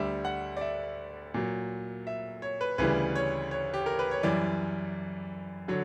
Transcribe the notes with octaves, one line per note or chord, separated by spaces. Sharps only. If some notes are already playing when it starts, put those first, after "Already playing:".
Already playing: D2 D3 G3 E5
F#5
D5
E5
A#2 F#3
E5
C#5
B4
D2 C#3 E3 G3 B4
C#5
C#5
G4
A#4
B4
C#5
F#2 E3 G3 D5
D3 F#3 C#5